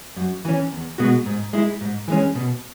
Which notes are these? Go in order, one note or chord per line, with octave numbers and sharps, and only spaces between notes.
F#2
E3 C#4
E2
B2 G#3 B3 F#4
G#2
G#3 E4
G#2
E3 G#3 C#4
B2